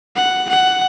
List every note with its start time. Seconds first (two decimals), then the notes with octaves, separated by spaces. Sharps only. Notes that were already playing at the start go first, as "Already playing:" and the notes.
0.16 F#5
0.50 F#5